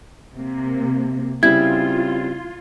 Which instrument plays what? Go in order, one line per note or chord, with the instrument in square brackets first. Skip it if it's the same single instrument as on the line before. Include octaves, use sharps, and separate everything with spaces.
[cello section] C3 A#3
[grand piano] C#3 G3 C4 [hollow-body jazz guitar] E4 [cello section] F4 [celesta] G#6